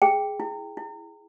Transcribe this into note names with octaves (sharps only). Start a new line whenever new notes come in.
G#4 G5
E4
E4